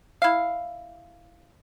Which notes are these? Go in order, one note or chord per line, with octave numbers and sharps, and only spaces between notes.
E4 F5